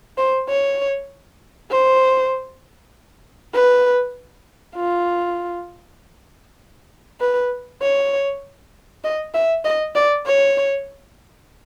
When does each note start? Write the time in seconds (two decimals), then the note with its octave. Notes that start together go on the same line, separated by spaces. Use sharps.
0.18 C5
0.48 C#5
1.71 C5
3.54 B4
4.76 F4
7.20 B4
7.82 C#5
9.04 D#5
9.34 E5
9.65 D#5
9.95 D5
10.26 C#5